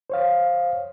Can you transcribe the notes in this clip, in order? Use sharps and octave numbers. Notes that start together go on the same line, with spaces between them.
C5 C#5 F5